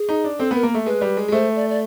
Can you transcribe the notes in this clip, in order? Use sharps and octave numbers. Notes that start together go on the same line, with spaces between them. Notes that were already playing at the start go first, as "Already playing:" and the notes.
Already playing: G#4
D#4
D4
C4 A4
B3 A#4
A#3
A3
G#3 B4
G3
G#3
G#3
A3 C5
D5
D5